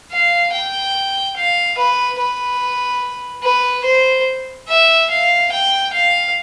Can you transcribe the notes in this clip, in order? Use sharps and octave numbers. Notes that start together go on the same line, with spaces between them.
F5
G5
F5
B4
B4
B4
C5
E5
F5
G5
F5